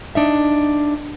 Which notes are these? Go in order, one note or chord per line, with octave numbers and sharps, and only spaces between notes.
D4 D#4 E5